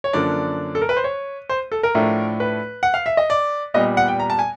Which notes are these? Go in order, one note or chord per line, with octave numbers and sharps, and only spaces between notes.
C#5
F#2 D3 F3 A#3 D4 D5
A4
A#4
B4
C5
C#5
C5
A4
A#4
A2 F3 A3 D4
B4
F#5
F5
E5
D#5
D5
A#2 G3 B3 D#5
F#5
G5
A#5
A5
G#5